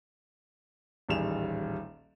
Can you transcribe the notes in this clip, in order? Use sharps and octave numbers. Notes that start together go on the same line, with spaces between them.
D#1 A1 G3 G#4 E7 F7